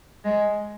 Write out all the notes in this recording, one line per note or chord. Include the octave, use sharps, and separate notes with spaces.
G#3